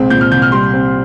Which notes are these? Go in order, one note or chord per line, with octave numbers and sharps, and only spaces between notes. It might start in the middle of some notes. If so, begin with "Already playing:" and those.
Already playing: C2 A#2 G#3 C4
A#2 G6
F6
C2 G6
F6
G3 C6
C4